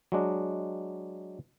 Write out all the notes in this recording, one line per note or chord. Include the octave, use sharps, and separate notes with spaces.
F#3 G#3 D4